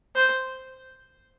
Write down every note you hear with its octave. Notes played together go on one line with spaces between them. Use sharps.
C5